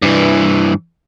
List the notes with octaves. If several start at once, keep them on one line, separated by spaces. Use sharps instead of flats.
G2 E3